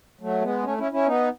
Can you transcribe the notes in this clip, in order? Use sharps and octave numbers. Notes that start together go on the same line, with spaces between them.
F#3 A3
G#3 B3
A3 C#4
C#4 E4
C#4 E4
B3 D#4